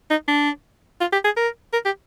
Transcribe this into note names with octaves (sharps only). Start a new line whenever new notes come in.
D#4
D4
F4
G4
G#4
A#4
A#4
G4